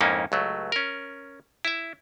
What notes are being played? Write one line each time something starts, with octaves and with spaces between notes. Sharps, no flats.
F2 G#2 A#3 C#4 D#4 E4
C#2 F#3 A3
C#4 A#4
E4 E5